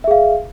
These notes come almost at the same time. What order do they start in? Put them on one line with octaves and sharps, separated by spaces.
E5 G#4 F5